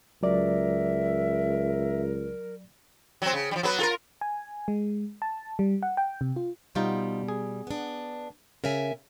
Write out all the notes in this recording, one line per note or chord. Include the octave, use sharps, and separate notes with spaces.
C#2 F#3 A#4 D5 E5
F#3 C4
C#3
F3 G3
F#3 B3 B4
F4 A4 A#4
G#5
G#3
A5
G3
F#5
G5
C3
F4
B2 G3 D#4 F4 C5
G#4
B3 D4
C#3 A#4 E5 G#5